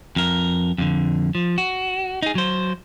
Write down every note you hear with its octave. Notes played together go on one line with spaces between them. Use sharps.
F2 A#4
F2 D3
F3
F#4
D#4 G#4
F#3 C5